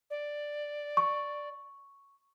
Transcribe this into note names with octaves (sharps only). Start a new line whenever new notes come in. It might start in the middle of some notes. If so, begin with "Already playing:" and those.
D5
C#6